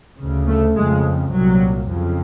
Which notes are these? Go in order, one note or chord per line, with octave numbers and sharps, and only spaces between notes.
D2 C#3
A3
F2 C#3 G#3
C2 A#2 F#3
F2 C#3